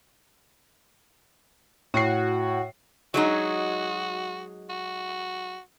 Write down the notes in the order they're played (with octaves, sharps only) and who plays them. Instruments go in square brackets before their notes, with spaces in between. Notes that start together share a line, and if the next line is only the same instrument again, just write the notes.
[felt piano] A2 C7 [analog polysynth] F#4
[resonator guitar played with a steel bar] F#3 G#3 D#4 [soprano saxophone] F#4
[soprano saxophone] F#4